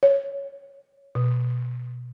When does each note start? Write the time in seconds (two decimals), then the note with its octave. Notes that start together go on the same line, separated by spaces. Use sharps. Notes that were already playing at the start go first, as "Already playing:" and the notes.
0.03 C#5
1.15 B2